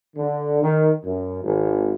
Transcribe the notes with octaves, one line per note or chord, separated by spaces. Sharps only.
D3
D#3
F#2
G#1